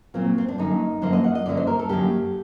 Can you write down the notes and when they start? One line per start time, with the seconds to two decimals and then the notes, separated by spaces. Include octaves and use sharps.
0.14 A#2 F#3 A#3 C4
0.38 C4
0.48 D4
0.58 F#2 D3 F#3 A#3 D#4
1.02 F#2 D3 F#3 A#3 C5
1.13 D#5
1.24 F#5
1.35 D#5
1.46 F#2 D3 F#3 A#3 D5
1.57 C5
1.67 A#4
1.79 A4
1.89 F#2 D3 F#3 A#3 G4